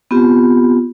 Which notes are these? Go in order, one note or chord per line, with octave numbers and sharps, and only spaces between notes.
B3 C4 F4 G4